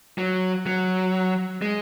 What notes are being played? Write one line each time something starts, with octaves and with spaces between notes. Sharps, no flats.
F#3
F#3
G#3